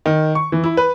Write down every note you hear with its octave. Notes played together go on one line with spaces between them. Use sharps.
D#3
C#6
E3
E4
B4